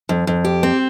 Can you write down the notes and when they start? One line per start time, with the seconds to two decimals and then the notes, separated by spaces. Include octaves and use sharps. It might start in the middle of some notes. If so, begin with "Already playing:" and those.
0.09 F2
0.27 F2
0.44 G4
0.63 C4